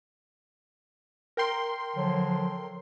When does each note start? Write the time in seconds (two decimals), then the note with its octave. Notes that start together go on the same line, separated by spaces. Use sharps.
1.37 A#4 G5 C6
1.95 D3 F3 F#3